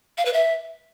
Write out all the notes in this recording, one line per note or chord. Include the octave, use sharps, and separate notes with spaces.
F5
B4
E5